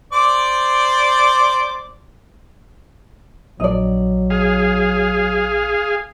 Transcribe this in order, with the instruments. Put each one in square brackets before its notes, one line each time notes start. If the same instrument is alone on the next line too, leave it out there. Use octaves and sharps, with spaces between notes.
[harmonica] C5 D5 D6
[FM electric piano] A#1 D4 [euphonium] F#3 [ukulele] D5 D#5
[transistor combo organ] G#4 F5